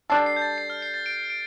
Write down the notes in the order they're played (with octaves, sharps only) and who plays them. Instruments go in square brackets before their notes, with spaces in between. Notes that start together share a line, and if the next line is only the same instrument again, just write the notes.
[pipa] G3 D4 A4 [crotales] C7
[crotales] C7
G6
A6
C7
F6
C7
A6
D7
D7